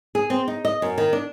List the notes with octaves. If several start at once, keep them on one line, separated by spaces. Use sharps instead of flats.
G#4
C4
D#4
D#5
F#2
D#3
D4